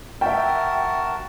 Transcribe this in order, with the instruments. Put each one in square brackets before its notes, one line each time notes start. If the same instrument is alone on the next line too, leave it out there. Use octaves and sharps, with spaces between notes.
[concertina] F#4 A#4 A5 [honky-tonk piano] E5 G5